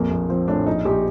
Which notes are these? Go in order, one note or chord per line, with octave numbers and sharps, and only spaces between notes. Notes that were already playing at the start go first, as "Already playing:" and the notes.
Already playing: A#1 F2 A#3
A#1
F3 C4
A2 D4
A#1 D#4
A#1 G4